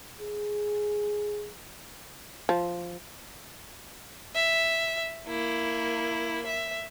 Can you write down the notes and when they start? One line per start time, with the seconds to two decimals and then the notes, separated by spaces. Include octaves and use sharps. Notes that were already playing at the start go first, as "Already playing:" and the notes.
0.20 G#4
2.49 F3
4.35 E5
5.27 A#3 E4
6.46 E5